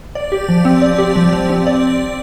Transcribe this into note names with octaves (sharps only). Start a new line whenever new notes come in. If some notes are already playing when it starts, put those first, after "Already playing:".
D5
G4
F3
C4
D5
G4
F3
F3
C4
D5